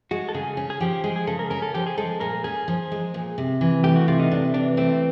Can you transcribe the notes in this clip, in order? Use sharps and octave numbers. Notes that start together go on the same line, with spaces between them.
G#3 F#4
A4
C#3 G#4
C#4
G#4
F3 G4
G#3 G#4
G#4
C#3 A4
A#4
C#4 A#4
A4
F3 G4
G#4
G#3 A4
A#2 A#4
C#4 G#4
F3
G#3
A#2
C3
E3
A3 G4
F#4
C3 F4
D#4
C3 D4
E3 D4
A3 C4